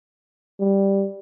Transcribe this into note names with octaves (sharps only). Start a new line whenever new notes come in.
G3